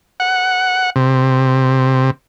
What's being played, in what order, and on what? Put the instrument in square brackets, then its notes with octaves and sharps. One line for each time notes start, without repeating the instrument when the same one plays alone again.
[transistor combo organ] F#5
C3